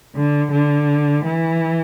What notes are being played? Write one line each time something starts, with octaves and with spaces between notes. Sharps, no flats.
D3
D3
E3